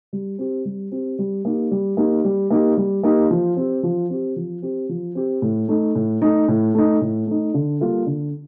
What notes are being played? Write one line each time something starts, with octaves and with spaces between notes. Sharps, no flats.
G3
C4 G4
G3
C4 G4
G3
A#3 D#4 G4
G3
A#3 D#4 G4
G3
A#3 D#4 G4
G3
A#3 D#4 G4
F3
C4 G4
F3
C4 G4
F3
C4 G4
F3
C4 G4
A2
A3 D#4
A2
A3 D#4
A2
A3 D#4
A2
A3 D#4
D3
G3 A#3 F4 A4
D3